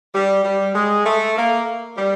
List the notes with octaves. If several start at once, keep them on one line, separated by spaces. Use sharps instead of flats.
G3
G3
G#3
A3
A#3
G3